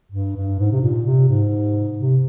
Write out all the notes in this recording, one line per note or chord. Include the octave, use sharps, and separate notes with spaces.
G2
G2
G#2
C3
A#2
C3
G#2
C3